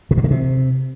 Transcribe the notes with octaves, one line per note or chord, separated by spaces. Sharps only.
B2
A#2
D#3
C3